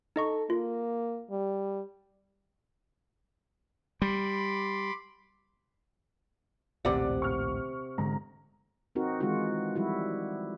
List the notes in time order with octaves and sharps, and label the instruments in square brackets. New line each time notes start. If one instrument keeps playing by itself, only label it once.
[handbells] D#4 D#5 C#6 [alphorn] A4
[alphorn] A#3 [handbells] F4
[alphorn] G3
[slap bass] G3 [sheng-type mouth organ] B5 C6 D6
[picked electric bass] A#1 D#2 A2 [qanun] C3 F#5 [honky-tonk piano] D5 D6
[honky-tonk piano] C#6 F6
[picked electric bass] G#2 D3 G#3 [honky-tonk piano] A#5
[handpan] C4 D#4 F#4 A#4
D#3 E3 G#3 D#4 F4 F#4
F3 G3 E4 F#4